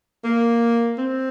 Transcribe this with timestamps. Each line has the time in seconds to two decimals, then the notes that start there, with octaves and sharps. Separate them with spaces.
0.24 A#3
0.98 C4